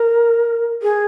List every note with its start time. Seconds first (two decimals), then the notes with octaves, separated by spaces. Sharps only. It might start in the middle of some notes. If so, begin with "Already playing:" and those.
Already playing: A#4
0.82 G#4